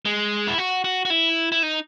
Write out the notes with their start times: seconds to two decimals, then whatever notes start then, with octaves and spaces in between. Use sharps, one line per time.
0.05 G#3
0.48 E4
0.58 F#4
0.84 F#4
1.05 F#4
1.10 E4
1.52 E4
1.63 D#4